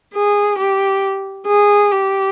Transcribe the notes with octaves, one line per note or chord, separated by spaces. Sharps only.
G#4
G4
G#4
G4